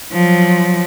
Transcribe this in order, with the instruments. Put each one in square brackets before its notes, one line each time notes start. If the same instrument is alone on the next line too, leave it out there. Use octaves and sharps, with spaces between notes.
[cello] F3 F#3